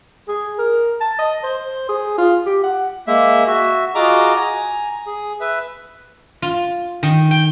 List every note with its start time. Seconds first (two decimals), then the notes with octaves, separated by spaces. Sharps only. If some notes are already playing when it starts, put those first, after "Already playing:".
0.28 G#4
0.58 A#4
1.01 A5
1.18 D#5
1.43 C5
1.89 G#4
2.18 F4
2.46 G4
2.63 F#5
3.07 G#3 A#3 E5
3.47 F#4 E5
3.95 F4 F#4 G#4 D#5 A#5 D6
4.36 G#5 A#5
5.06 G#4
5.40 B4 E5
6.42 F4
7.03 D#3
7.31 G5